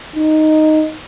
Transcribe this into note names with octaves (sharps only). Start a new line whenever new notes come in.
D#4